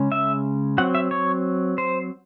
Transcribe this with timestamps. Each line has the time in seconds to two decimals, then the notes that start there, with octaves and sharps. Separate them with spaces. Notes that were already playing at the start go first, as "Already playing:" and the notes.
Already playing: C#3 G#3 C#4
0.12 E5
0.78 F#3 C4 F#5
0.95 E5
1.11 C#5
1.78 C5